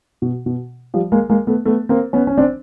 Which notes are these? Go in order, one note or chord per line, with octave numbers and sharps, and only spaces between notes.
B2
B2
F3 G3
G#3 A#3
G#3 A#3
A3 B3
A3 B3
A#3 C4
B3 C#4
C#4
C4 D4